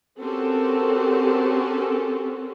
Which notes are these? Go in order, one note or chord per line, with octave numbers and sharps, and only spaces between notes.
C4 C#4 F#4 G4 A4 A#4